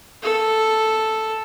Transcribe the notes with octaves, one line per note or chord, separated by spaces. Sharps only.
A4